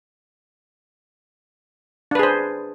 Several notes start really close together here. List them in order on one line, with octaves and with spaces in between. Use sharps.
D4 B4 G#4 C5